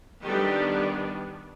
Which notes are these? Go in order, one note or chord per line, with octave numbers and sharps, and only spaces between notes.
D#3 G3 B3 D4 G4 A4